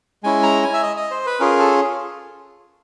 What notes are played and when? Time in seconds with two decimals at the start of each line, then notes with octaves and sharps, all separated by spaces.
0.23 G#3 C#4 E4 G#5
0.43 A#5
0.62 G#5
0.74 E5
0.83 D#5
0.97 D#5
1.11 C5
1.26 B4
1.40 C#4 F4 G#4 A#4
1.59 A4